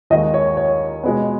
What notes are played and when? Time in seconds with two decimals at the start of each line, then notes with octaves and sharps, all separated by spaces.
0.10 D#2 D#3 G#3 D#5
0.34 C#5
0.57 C#5
1.04 B2 G#3 B3